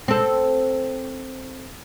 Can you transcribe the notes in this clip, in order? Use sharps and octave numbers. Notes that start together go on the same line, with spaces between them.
C4 A4